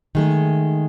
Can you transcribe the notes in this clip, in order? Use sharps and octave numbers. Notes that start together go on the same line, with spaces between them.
D#3 G#3 A3